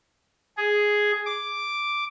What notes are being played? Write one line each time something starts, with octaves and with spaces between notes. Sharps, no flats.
G#4
D6